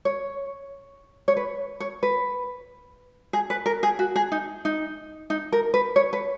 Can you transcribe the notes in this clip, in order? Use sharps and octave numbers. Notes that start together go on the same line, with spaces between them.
C#5
C#5
B4
C#5
B4
G#4
B4
A#4
G#4
F#4
G#4
D#4
D#4
D#4
A#4
B4
C#5
B4